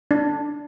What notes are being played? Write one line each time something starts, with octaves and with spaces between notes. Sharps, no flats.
D4